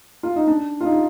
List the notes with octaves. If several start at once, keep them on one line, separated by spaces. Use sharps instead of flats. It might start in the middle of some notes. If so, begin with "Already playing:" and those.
F4
D#4
D4
F4
D#4